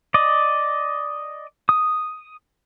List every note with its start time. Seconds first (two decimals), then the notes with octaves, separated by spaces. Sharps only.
0.14 D5 D#5
1.69 D#6